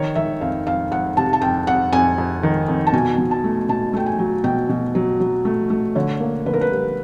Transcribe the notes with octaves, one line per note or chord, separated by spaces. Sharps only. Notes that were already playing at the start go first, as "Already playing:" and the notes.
Already playing: D#3 C#5
D#3 E5
F2 F5
F2 F5
F2 F#5
C3 A5
A5
F2 G5
F2 F#5
F2 G#5
F2
D#3
F2
A5
B2 G#5
B2
A5
A3
B2 A5
A3 G5
G#5
F#3
B2 G5
B2
F#3
F#3
A3
A3
D3 C#5
A#3
D3 B4
A#4
B4
G3